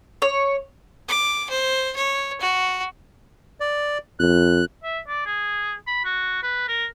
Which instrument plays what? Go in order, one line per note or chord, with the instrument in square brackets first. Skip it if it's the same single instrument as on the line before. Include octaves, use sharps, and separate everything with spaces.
[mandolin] C#5
[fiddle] D6
C5
C#5
F#4
[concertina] D5
[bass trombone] F2 [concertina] F#6
[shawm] E5
D5
G#4
B5
F#4
B4
A#4